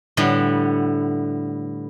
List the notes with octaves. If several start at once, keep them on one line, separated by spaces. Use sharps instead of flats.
A2 D3 G3 B3